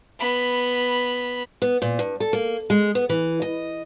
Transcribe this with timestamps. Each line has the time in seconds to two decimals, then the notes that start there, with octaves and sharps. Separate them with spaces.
0.19 B3 B5
1.62 B3
1.82 A#2
1.99 G2
2.20 A4
2.33 A#3
2.70 G#3
2.95 B3
3.09 E3
3.42 D#5